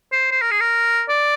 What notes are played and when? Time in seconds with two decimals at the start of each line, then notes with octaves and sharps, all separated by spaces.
0.12 C5
0.31 C5
0.41 A#4
0.51 G#4
0.60 A#4
1.09 D5